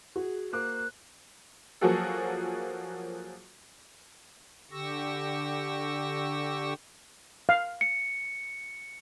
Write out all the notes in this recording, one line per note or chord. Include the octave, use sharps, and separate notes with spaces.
F#4 G#4
A#3 C5 D6 F#6
F3 F#3 A#3 F#4 G#4 A4
D3 G4 C#6 E6 A#6
F5
C#7